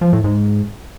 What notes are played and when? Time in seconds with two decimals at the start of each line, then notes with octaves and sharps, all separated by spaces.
0.01 F3
0.13 A2
0.24 G#2